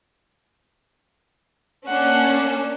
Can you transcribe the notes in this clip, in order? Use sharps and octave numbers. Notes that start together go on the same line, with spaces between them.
A#3 C#4 D4 F#5